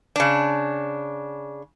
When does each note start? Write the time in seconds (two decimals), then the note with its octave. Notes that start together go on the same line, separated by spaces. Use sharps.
0.16 C#3 D4